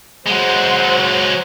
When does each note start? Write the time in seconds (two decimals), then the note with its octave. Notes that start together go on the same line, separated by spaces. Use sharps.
0.26 F#3 G#3 C5 F#5